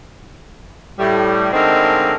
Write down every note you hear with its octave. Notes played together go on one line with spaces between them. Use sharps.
A2 G3
D3 G#3 A3 C4 D#4 A#4